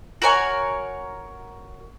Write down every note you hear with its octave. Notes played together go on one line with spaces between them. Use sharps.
F#4 A#4 C#5 G#5